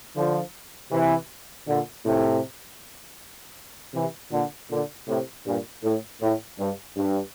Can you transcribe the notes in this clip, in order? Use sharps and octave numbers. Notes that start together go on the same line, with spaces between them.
D3 F3
C3 E3
A#2 D3
A2 C3
C3 E3
A#2 D3
A#2 D3
A2 C3
G2 A#2
A2
A2
G2
G2